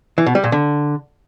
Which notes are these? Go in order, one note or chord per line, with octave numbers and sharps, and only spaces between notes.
E3
B2
G3
A#2
D3